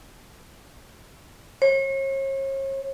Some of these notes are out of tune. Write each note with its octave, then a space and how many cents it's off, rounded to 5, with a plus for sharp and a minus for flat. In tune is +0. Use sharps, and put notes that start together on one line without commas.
C#5 -40